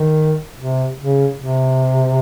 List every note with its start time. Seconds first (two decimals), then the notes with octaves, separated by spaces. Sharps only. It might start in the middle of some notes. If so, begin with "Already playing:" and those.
Already playing: D#3
0.59 C3
1.00 C#3
1.40 C3